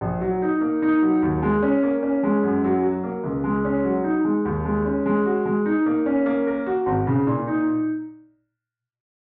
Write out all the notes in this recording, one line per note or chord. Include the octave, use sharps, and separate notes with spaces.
A#1
F#3
D#4
A#3
D#4
F#3
D#2
G#3
C#4
A#3
C#4
G#3
F#2
F#3
F#4
A#3
C#2
G#3
C#4
F#3
D#4
G#3
D#2
G#3
C#4
G#3
F#4
G#3
D#4
A#3
C#4
A#3
A#4
F#4
G#1
C#3
A#2
D#4